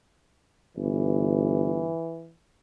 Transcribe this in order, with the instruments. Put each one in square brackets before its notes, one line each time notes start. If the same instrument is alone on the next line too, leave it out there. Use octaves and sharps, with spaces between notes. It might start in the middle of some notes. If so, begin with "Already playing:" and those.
[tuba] G1 [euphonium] E3